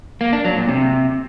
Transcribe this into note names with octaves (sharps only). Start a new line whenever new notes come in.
A#3
D4
F#3
A#2
C3